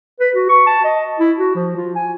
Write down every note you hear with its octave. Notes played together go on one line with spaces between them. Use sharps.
B4
F#4
C#6
A5
D#5
E4
F#4
F3
F4
G#5